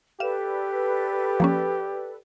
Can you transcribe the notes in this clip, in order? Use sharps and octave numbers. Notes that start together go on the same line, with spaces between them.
G4 A4 B4 D5 F5 E7
F3 A#3 C#4